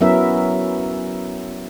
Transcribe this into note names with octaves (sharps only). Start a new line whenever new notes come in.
F#3 B3 C#4 E4 A#4 E5